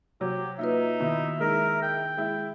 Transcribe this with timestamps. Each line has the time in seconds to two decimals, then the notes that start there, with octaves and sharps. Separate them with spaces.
0.21 C3 F#3 G4
0.59 A#3 D#4 F4 B4 E5
1.00 B2 D#3 E4
1.40 G#3 D#4 E4 A#4
1.83 G5
2.17 G#3 E4